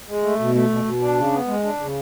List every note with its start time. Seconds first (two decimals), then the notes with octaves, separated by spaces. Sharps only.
0.08 G#3
0.23 A3
0.39 B2
0.55 A3
0.70 B2
0.85 B2
1.01 D4
1.17 C#3
1.33 B3
1.47 G#3
1.64 D4
1.79 C#3